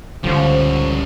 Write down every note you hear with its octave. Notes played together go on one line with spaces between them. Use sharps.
C#2 D3 F3 G3 C#4